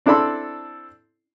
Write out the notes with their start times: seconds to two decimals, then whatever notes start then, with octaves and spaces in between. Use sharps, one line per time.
0.06 C4 D4 E4 A4 B5 C6